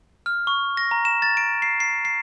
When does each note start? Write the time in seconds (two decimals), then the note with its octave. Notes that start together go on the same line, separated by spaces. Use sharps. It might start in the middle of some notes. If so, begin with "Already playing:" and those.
0.26 F6
0.47 C#6
0.77 A#6
0.91 A#5
1.05 E7
1.22 A6
1.37 D7
1.62 C7
1.80 C7
2.05 C7